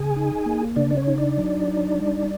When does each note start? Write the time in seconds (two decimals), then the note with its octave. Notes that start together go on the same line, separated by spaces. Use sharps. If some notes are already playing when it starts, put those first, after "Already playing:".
Already playing: C#3 G#4 G#5
0.16 D#4
0.46 A#3
0.76 C#3 D4 D5
0.91 D5
0.97 C#4 C#5
1.07 D#4
1.18 D4 D5
1.37 F#3
1.68 D#4
1.98 G3